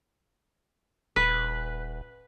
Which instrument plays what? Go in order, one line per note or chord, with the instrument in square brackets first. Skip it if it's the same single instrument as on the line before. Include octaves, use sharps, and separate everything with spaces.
[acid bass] D#1 [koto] B4